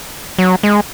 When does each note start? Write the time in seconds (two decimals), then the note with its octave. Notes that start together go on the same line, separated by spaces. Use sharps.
0.39 F#3
0.63 G#3